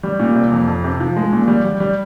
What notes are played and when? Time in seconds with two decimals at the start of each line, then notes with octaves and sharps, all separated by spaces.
0.03 G3
0.20 A#2
0.35 C3
0.51 F2
0.67 F2
0.84 C3
1.00 F3
1.17 G#3
1.33 A#2
1.48 G3
1.64 G3
1.80 G3